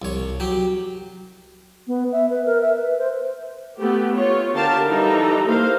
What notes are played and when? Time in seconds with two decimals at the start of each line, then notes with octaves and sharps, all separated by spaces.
0.02 C2 C#5
0.40 F#3 G4
1.87 B3
2.12 E5
2.30 B4
2.46 A#4
2.61 E5
2.76 B4
2.98 C5
3.78 A3 B3 G4
4.15 F4 C#5
4.52 D3 G4 A#4 F5 A5
4.87 E3 G3 D#4 A4 A#5
5.46 A#3 C5 F5